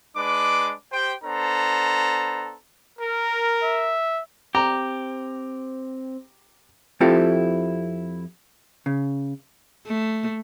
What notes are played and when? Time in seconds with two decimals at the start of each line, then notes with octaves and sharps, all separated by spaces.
0.17 G#3 D4 B4 D6
0.92 G4 C5 G5
1.24 B3 D4 A4 C5 A#5
2.98 A#4
3.64 E5
4.55 C4 G4 A#5
7.00 F2 C4 E4 F4 G4 A4
8.86 C#3
9.87 A3